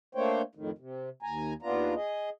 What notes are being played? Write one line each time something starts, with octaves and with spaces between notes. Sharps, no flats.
A3 A#3 D4 C5 C#5 G5
F2 A2 D#3
C3
D#2 G#5 A#5
D#2 B3 D4 F4 A#5
G#4 D#5